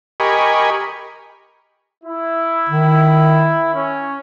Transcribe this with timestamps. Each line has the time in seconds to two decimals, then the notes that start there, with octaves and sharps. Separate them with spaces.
0.20 G4 A#4 D#5 G#5 B5 C#6
2.04 E4
2.69 D#3
3.74 C#4